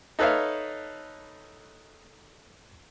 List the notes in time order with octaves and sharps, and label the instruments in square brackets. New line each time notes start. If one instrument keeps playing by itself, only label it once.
[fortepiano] D#4 A4 B4 C#5 E5 F5